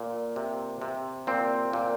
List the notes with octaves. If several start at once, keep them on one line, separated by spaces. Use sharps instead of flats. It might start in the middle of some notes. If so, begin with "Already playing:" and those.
Already playing: A#2
C3
C3
A#2 C4
A#2